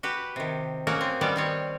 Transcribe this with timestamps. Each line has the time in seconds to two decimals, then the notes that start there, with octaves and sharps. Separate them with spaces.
0.03 F#4 G4 B4
0.36 C3 D#3
0.87 A#3 C#4 D#4 F#4 A#4
1.01 C4
1.21 D#3 G3 B3 C#4 D5
1.36 D#3 C4 C#5